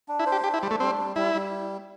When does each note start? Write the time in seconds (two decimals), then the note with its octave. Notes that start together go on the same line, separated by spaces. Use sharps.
0.08 D4
0.19 E4
0.26 C5
0.32 G4
0.44 D4 G4
0.54 E4
0.62 G3 D4
0.71 A3
0.80 G3 C4
0.98 G3
1.16 G3 E4
1.34 G3